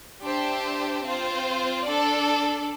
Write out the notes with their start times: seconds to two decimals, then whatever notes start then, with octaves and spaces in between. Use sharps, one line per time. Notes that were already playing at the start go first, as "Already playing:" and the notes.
0.22 D4 G4 C5 E5 A5
1.03 C4 F4 C5
1.84 D4 A4 D5